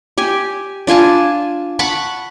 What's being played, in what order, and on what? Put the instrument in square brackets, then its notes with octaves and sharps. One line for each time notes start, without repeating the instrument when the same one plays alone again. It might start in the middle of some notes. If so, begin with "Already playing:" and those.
[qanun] G4 G#5
D4 F4 G#5 A5
F#5 A5 B5 C#6